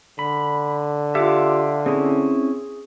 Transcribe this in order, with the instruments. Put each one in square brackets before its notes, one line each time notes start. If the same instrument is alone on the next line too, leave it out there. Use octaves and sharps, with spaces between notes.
[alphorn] D3 [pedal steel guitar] B5
[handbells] F4 G4 [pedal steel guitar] E5 F5 D6
[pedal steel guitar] C4 C#4 E4 [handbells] G#4